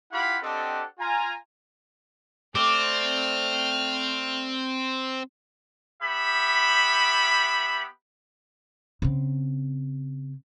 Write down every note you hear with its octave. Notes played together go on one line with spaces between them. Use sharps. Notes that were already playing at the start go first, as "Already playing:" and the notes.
E4 F4 G4 F5 F#5 B5
C4 D4 G4 A4 D#5 F#5
F4 G#5 A#5
A3 C4 D5 F6
B3 G4 E5 B5
C#3 C4